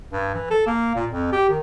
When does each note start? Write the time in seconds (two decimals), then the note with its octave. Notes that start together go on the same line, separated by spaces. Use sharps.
0.12 G2
0.34 E3
0.50 A4
0.67 A#3
0.95 A#2
1.11 F2
1.32 G4
1.49 D#3